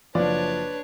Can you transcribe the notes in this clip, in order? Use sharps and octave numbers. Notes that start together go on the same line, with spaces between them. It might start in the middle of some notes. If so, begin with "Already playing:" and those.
F#1 F3 D4 B4 C#5 D5